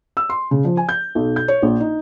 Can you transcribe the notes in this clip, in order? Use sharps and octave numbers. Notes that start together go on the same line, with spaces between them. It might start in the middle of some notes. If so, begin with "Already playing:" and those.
E6
C6
C#3
F3
G#5
G6
B1
G6
C#5
A#1
D#4